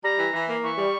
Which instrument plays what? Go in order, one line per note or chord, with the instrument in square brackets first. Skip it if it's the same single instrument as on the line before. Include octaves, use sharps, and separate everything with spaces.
[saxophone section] G3 [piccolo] A#5
[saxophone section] E3
E3
A#3
[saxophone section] E3 [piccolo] C#6
[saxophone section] G3